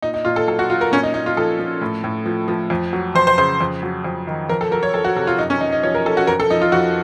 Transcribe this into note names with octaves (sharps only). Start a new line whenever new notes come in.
A#2 D#4
D#4
A#2 F4
A4
F#3 A4
F#4
F#3 F4
A#4
A#2 C#4
D#4
A#2 D#4
F4
F3 A4
F3
A2
A2
F3
F3
F2
F#3
F2 C5
C5
C#3 C5
F2
F#3
F2
D#3
F2 A#4
A4
F#3 A#4
C#5
F2 A4
F#4
C3 A4
F4
F#2 D#4
C#4
F#2 D#4
D#4
F3 C#5
A#4
F3 A4
F#4
F2 A#4
A4
F3 D#4
F4
F2 F#4